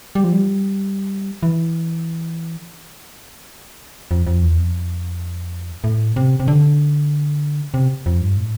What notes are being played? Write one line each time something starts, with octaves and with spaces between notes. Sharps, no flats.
G3
F3
G3
E3
F2
F2
E2
F2
A2
C3
C3
D3
C3
F2
G2
A2